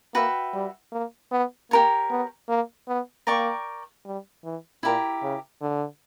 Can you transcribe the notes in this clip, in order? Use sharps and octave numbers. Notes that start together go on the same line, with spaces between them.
A#3 F#4 B4 E5 G5
G3
A#3
B3
A#3 G4 A#4 C#5
B3
A#3
B3
A#3 A#4 D5 G5 C#6
G3
E3
A#2 E4 G4 A#4
C#3
D3